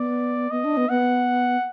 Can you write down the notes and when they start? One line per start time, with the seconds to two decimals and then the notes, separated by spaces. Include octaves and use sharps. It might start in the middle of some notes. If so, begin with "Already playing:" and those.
Already playing: B3 D5
0.51 B3 D#5
0.64 D4
0.77 B3
0.89 B3 F#5